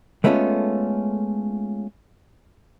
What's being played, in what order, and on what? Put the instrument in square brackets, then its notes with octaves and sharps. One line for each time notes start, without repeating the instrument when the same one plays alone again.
[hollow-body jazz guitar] G#3 A3 B3 C#4 F4 A4